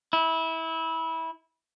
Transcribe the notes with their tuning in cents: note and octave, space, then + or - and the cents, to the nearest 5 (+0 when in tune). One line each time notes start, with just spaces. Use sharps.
E4 -20